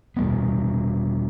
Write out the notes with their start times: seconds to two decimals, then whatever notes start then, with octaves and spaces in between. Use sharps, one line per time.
0.17 E2 B2 G3 B3